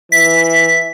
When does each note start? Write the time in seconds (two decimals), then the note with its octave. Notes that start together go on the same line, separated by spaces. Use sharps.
0.12 E3 E5 B6